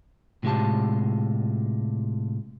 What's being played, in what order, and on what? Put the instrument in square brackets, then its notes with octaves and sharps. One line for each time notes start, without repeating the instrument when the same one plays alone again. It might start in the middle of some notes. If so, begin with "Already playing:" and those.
[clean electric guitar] A2 C3 G#3 F4 G4 A5